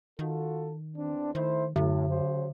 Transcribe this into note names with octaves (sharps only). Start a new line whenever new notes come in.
D#3 F4 F#4 A4
E2 C4 D4
D#3 A3 E4 C5
F#2 A2 D3
C#3 F#3 C5